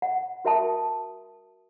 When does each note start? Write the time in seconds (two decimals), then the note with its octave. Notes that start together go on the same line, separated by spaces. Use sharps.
0.02 F#5
0.45 F#4 A#4 E5 G5 A5 D#6